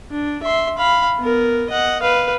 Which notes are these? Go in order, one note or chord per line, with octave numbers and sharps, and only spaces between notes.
D4
E5 C6
F5 B5
B3 A#4
D#5 F#5
B4 F5